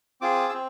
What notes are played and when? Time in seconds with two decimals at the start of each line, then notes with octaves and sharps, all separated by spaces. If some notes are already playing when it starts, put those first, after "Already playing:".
0.21 C4 F4 G#4 D6
0.49 E6
0.54 C4